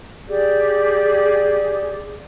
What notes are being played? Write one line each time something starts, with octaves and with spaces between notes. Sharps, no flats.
G4 G#4 D5